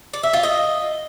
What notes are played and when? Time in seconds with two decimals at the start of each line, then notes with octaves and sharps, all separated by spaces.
0.14 D5
0.23 E5
0.33 F4
0.43 D#5